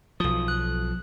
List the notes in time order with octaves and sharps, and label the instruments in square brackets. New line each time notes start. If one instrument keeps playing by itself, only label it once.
[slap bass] B1 F3 [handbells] D#6
[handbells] F#6